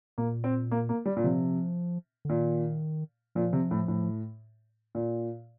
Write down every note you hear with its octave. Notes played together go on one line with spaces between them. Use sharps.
A#2 A#3
C4
A#3
A#3
G3
A#2
C3 F3
D3
A#2 D#3
A#2 F3
C3
A2
A2
A#2